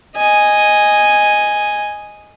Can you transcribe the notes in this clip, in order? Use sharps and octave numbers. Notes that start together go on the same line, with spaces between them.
D#5 G#5